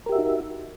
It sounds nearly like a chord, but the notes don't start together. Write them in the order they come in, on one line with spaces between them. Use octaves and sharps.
A#4 G4 E5 F#4 D#4